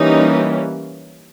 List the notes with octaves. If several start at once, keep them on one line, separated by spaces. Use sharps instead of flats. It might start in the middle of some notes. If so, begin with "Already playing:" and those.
Already playing: E3 G3 A#3 C#4 D#4